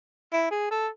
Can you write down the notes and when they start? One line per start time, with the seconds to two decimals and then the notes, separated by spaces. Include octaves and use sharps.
0.33 E4
0.51 G#4
0.71 A4